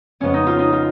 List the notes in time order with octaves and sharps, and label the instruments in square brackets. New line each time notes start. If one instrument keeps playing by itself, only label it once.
[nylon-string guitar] F2 C#3 G#3 B3 [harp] C#4
[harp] D#4
F4
D#4
F4